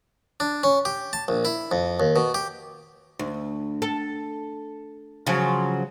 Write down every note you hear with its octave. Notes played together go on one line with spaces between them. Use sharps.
D4
C#4
G4
A5
A#1
E4
F2
D#2
B2
G4
D2
A4
C#3 F3 F#3